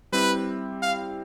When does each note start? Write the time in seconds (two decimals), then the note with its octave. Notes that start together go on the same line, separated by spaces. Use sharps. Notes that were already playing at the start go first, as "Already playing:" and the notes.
0.12 G3 C4 E4 G4 B4
0.82 F5